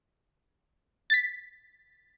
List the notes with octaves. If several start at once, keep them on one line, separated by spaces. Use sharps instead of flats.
A6 B6